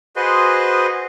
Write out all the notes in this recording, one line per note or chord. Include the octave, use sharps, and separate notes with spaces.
F#4 G#4 B4 C5 D#5 C6